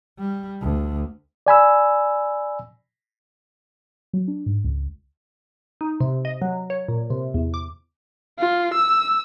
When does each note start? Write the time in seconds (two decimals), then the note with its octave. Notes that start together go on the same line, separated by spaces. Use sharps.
0.18 G3
0.61 D2
1.47 D5 G#5 B5 E6
4.13 F#3
4.28 D4
4.46 G#2
4.64 C#2
5.81 D#4
6.01 C3
6.25 D#5
6.42 F#3
6.70 C#5
6.89 A#2
7.10 C3
7.34 E2
7.54 D6
8.39 F4
8.74 E6